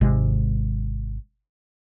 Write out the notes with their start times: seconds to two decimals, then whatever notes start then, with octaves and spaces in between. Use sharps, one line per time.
0.01 G#1 C3 G#3